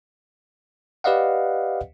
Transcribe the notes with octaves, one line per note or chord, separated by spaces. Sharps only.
G4 B4 D5 D#5 F5 F#5